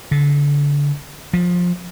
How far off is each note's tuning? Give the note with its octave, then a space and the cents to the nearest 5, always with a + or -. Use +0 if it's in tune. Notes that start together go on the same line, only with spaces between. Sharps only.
D3 -30
F3 +20